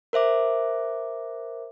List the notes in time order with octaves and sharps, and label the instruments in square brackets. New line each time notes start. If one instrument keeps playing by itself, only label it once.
[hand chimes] A#4 C5 E5 D6